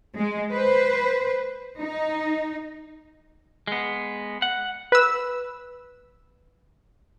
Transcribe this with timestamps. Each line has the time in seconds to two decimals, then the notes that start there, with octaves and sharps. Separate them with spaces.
0.15 G#3
0.52 B4 C5
1.79 D#4
3.67 G#3 B3
4.42 F#5
4.92 B4 E6